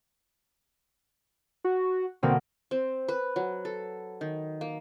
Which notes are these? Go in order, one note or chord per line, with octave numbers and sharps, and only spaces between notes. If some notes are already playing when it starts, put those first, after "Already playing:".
F#4
B2 D3 A#3 C4
C4
B4
F#3
A4
D#3
A#3